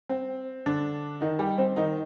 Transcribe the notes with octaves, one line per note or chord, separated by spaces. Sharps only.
C4
D3 D4
D#3 D#4
G3 G4
C4 C5
D#3 D#4